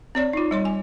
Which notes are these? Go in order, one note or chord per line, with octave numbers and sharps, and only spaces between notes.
C4 C#5 D5
D#4 F4
G3 C#5 C6
G#5